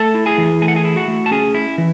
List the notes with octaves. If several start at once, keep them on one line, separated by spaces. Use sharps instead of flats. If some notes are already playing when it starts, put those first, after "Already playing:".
Already playing: A3 A4 A5
E4
G#4 G#5
E3
A3 G#5
F#5
G#4 G#5
E4
F#4 F#5
A3
A5
C#4 G#4 G#5
E4
E3